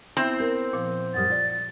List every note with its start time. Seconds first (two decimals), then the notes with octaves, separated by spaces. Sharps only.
0.17 B3 C4 E4 E5
0.40 A#4
0.73 A#2 F3
1.14 F#2 G3 F#5 D#6 F6 A6
1.30 F4 D5